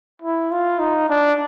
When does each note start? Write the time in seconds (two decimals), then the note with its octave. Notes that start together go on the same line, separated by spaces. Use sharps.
0.22 E4
0.51 F4
0.79 D#4
1.09 D4